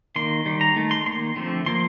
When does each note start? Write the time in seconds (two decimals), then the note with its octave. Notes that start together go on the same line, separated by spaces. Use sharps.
0.16 D#3 A#3 C6
0.45 D#3 G3
0.61 A#5
0.76 D#3 A3
0.91 C6
1.06 D#3 A#3 C6
1.36 D3 F3 A3 C4
1.66 F3 A#3 C6